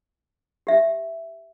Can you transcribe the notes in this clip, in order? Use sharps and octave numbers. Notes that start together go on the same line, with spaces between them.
G4 E5